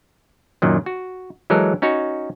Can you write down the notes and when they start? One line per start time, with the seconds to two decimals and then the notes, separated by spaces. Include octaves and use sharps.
0.62 F#2 A#2 D#3 F#3
0.86 F#4
1.50 E3 F#3 G#3 A4 A#4
1.82 C#4 D#4 F#4 C#5